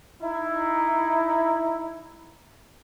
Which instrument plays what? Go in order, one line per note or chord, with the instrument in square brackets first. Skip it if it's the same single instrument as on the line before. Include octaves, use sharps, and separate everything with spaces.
[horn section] D#4 E4